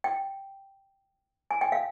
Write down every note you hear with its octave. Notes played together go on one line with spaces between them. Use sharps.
G5
G#5
G5
F5